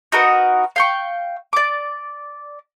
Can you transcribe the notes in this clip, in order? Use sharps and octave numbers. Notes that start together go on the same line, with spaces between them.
D#4 F#4 A#4 B4
F5 G5 C#6
D5 D6